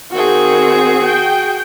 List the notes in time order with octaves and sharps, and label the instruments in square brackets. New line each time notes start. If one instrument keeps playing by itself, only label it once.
[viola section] D#3 C4 [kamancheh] F#4 G#4
[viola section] G5